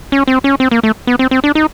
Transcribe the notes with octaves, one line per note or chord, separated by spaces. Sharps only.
C#4
C4
C#4
C4
A#3
A3
B3
C4
C4
D4
D#4